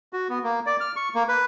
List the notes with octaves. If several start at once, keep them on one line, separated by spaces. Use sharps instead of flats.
F#4
B3
A#3
D5
F6
C#6
A#3
B4